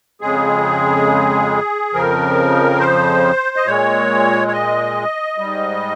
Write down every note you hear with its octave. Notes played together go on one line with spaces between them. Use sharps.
F2 C#3 G#3 G#4
F2 C#3 F3 A#4
C5
D#5
A#2 G#3 C#5
C#5
D#5
G#2 G3